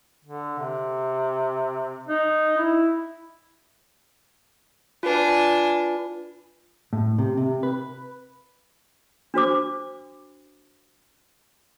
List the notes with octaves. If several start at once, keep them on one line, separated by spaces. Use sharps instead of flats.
D3
C3
D#4
E4
D4 F4 B4 G#5
A2
C3
C3
B4
D4 F#4 C5 D6